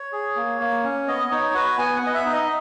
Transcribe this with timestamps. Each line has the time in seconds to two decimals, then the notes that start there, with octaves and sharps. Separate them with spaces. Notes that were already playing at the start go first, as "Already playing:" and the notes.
Already playing: C#5
0.12 G#4
0.36 A#3
0.60 A#3
0.83 C#4
1.08 B3 D#5
1.31 D#4 C#5
1.54 F#4 B4
1.78 B3 G#5
1.96 F#5
2.03 B3 D#5
2.14 E5
2.26 D#4
2.33 D#5